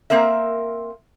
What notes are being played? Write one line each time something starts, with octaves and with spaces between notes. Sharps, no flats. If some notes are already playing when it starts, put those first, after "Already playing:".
A#3 C4 A#4 E5